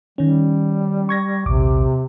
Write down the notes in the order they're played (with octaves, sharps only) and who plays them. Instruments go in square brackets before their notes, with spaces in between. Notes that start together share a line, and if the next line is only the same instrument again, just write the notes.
[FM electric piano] D#3 C#4 [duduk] G3
[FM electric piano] C#6 G#6 A#6
[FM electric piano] A#1 D#2 D6 [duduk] C3